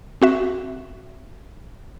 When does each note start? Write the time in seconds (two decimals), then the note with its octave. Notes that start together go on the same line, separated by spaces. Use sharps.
0.22 C4 F#4 E5